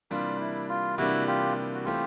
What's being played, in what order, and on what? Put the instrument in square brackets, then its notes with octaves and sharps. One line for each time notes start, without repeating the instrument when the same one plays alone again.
[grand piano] C3 E3 G3 A#3 D4 [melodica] F4
[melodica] E4
F4
[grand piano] C3 E3 G3 A#3 D4 [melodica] E4 F#4
[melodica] F4 G4
F#4
[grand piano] E3 A3 C4 [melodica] F4 G4